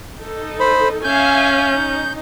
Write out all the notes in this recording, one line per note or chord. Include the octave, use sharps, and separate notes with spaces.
D#4 A4
C5 B5
C#4 E5 F5 G#5 G6
D#4